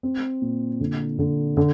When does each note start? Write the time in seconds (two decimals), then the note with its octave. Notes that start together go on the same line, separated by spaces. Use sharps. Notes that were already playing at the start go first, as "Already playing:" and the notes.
0.03 C4
0.42 A#2
0.80 D3
1.19 D3
1.57 D3